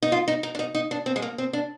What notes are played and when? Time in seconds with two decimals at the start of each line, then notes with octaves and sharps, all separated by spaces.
0.02 D#4
0.12 F4
0.28 D#4
0.43 D#4
0.55 D4
0.59 D#4
0.75 D#4
0.91 D4
1.06 C4
1.16 G#3
1.22 A#3
1.38 C4
1.53 D4